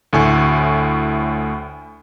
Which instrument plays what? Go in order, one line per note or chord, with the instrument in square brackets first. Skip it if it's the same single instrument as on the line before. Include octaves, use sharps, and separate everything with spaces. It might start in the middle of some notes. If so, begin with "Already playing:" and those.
[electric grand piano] D2 A2 G#5 C#6